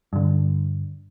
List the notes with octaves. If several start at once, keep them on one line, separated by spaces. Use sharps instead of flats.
G2 D3